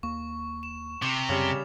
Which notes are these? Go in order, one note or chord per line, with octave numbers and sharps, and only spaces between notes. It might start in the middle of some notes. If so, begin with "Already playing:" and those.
D#2 A#3 C#6
E7
C3 D6 E7 F7
F#2 C#3 G3